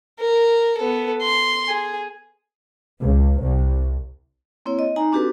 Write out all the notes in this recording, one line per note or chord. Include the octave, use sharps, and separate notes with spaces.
A#4
B3 A4
C6
G#4
C#2
C2
A#3 C4 E4 C#5
D#5
D#4 G#5 A#5
C4 D4 F#4 G4 A4 B4